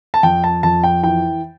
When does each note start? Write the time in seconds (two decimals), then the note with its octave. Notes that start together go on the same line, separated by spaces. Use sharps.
0.14 A5
0.23 F2 G5
0.44 A5
0.63 F2 A5
0.84 G5
1.03 E3 G5